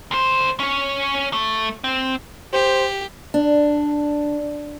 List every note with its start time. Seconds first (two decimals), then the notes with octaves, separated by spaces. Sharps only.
0.11 D2 C5
0.60 C#4 C#5
1.33 A3
1.84 C4
2.53 G4 C5
3.34 D4